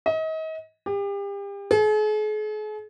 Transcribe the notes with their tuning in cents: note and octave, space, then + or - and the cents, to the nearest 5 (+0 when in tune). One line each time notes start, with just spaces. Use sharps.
D#5 +35
G4 +35
G#4 +45